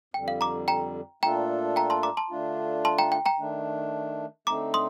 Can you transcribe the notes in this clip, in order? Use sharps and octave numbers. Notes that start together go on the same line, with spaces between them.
F2 D3 G3 G5
F5
A#5 D6
G5 A#5
A#2 A3 D4 F4 A4 G5 A#5
G5 A#5
A5 C6
A#5 D6
A5 C6
D3 A3 D4 F4
A5 C6
G5 A#5
G5
G5 A#5
D#3 A3 D4
D3 A3 C4 D#4 A#5 D6
C6 D#6